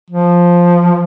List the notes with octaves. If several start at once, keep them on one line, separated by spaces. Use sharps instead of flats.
F3